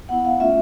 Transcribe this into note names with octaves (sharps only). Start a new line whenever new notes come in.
B3 E4 F#5
F5
A3 C#4 F4 E5